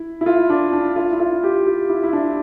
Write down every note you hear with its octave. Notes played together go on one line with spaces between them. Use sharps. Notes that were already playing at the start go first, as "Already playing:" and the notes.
Already playing: E4
E4
F4
D4
D4
F4
E4
F4
G4
G4
E4
E4
D4